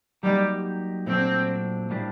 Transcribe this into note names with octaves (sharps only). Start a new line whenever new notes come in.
F#3 G3 A#3 D#4 G4
A#2 F#3 A3 C4 D4
A2 G3 A#3 D4 G4